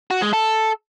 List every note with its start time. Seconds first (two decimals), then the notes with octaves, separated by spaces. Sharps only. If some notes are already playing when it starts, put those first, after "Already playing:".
0.11 F#4
0.22 G#3
0.33 A4